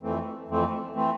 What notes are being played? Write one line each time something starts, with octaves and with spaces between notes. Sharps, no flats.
F2 E3 A3 C4
F2 E3 A3 C4
E3 A3 C4